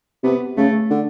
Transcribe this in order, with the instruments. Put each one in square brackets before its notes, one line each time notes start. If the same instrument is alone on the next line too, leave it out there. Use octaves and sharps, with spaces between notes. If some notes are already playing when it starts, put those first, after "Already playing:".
[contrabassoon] C3 [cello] B3
[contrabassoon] C#3 [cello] A3
[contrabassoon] D3